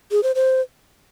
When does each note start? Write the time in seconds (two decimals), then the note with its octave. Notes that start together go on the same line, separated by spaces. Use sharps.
0.11 G#4
0.23 C5
0.35 C5